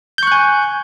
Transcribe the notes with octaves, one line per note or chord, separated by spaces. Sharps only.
G#5 C#6 F#6 G6